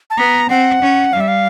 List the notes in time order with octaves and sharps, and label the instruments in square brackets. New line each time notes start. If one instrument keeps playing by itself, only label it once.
[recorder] A5
[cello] B3 [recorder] A#5
[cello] C4 [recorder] F#5
[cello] C#4
[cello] G3 [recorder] F5
[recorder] E5
F5